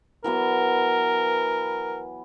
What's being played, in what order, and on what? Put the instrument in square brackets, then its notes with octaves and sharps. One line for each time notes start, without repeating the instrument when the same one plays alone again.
[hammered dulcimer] E3 F#3 B3 [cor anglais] A#4